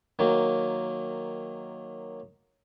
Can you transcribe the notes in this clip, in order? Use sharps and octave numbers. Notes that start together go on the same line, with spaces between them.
D#3 F#3 A#3